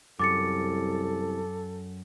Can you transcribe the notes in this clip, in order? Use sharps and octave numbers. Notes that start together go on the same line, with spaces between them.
C2 F#2 A4 D6 A6 C#7